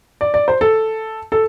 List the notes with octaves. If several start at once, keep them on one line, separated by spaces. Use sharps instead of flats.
D5
D5
C5
A4
A4